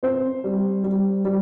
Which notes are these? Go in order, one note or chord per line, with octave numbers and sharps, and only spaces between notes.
C4 C5
G3
G3
G3